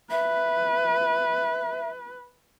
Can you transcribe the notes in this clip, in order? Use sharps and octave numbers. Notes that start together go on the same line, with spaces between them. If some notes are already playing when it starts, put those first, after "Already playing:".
B4 E5